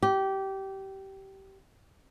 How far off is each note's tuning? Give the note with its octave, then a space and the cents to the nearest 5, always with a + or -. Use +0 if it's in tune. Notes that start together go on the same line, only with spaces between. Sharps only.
G4 -20